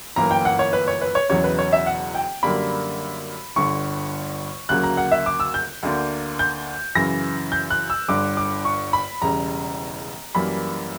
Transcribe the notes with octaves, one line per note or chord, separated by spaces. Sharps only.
G1 F#2 E3 A#3 A#5
G5
F#5
C#5
B4
C#5
B4
C#5
E1 E2 C#3 F#3 C#5
B4
C#5
E5
F#5
G5
F#2 D3 G3 A#3 B5
G1 G2 D3 C#6
D2 C#3 F#3 A#3 F#6
A#5
F#5
E5
D6
E6
G6
D2 D3 A#3
G6
F#2 C#3 E3 A#6
G6
F#6
E6
G1 G2 D3 D6
D6
C#6
B5
E1 E2 C#3 G3 A#5
F#2 E3 G3 A#3 B5